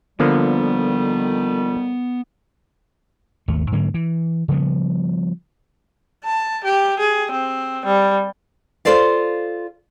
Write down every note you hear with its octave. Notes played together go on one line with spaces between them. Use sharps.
F2 D3 D#3 F3 G3 A#3 B3
G#1 D#2 A3
G#2 D3 F#3 A#3
E3
C#3 F3 G3 B3
A5
G4
G#4
C4
G3
F4 G4 A4 C5 D5 F5